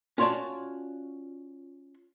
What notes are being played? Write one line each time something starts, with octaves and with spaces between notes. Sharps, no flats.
C#4 F4 F#4 C#5 D5 A5